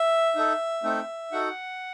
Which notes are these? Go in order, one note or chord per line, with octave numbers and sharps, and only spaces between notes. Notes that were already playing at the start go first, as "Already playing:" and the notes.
Already playing: E5
D#4 A4
A3 C4 D#4 A4
D#4 F#4 A4 F#5